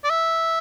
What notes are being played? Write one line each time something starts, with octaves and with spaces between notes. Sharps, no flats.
D5
E5